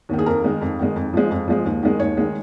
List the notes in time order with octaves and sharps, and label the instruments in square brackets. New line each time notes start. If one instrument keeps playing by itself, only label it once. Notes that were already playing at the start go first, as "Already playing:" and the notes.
[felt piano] D#2 D#3
G#4
F2 A#4
D#3 G#3
F2
D#3 G#3
F2
F3 G#3
F2
F3 G#3
D#2
D#3 G#3
D#2 C#5
D#3 G#3